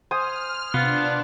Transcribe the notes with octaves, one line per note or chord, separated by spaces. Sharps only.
C5 G#5 D#6 F6
C3 B3 D4 F4